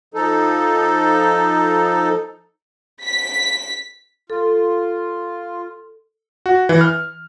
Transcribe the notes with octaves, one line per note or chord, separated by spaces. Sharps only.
F3 D#4 A4
B6
F4 A4
F#4
E3
F6